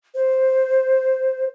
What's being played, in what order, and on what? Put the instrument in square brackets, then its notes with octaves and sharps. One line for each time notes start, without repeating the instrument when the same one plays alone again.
[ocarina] C5